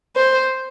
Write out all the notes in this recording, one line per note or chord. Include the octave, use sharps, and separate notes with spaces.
C5